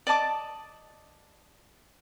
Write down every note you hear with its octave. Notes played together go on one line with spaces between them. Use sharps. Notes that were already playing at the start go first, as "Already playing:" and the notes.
D5 D#5 A5 D6